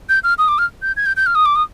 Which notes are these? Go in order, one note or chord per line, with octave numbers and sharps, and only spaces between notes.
G6
F6
D#6
D6
F6
G6
G#6
G6
G6
F6
D#6
D6
D#6